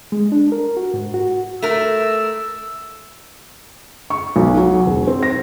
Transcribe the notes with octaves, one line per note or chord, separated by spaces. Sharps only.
G#3
D4
A#4
F#4
G#2
F#4
A3 A#4 E6
C#6
B1
F#3
E1
C4
A#6